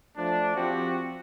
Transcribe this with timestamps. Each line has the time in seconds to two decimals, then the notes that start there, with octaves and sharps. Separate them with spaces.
0.17 F3 A3 D4
0.55 F3 C4 F#4 G4